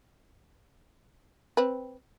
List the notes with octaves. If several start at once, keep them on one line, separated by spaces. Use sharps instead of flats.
C4 B4